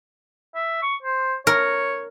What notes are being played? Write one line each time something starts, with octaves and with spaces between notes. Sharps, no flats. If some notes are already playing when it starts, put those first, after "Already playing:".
E5
C#6
C5
A#4 C#5